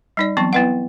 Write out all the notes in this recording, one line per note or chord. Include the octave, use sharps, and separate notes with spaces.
G3 D#4 D5
E3 F#3 B3 C4 A5 C#6
B3 E4 B4 D#5 F#5